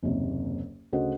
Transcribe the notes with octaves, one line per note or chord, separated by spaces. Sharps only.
F#1 D#2 C3
D2 C#3 F#4 C5 D#5 F#5